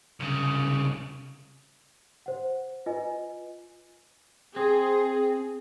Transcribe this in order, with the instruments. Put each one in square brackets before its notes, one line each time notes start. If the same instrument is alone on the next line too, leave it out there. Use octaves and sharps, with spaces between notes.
[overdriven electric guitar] C2 C#3
[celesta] C5 F#5
F4 B4 D#5 G#5
[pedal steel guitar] C4 [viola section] G#4